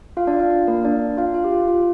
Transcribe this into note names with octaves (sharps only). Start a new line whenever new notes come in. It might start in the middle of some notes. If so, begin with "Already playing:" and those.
F4 F5
D4 D5
F4 F5
A#3 A#4
D4 D5
F4 F5
F4 F5
G4
F4
F4